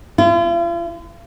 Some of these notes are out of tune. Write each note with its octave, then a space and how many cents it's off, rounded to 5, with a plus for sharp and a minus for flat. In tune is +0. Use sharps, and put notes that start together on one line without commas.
F4 -45